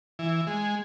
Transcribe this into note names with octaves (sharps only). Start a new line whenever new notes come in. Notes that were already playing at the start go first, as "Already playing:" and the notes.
E3
G#3